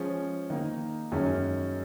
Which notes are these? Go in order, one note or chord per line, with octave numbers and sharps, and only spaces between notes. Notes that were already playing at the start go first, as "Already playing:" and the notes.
Already playing: F3 G#3 C#4 G#4
D#3 A#3 D#4
F#2 D#3 G#3 C#4